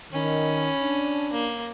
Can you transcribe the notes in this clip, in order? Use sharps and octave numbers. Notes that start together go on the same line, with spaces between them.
D#3 C#4 B5
D4
A#3